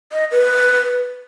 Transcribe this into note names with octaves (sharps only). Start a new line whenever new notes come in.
D#5
B4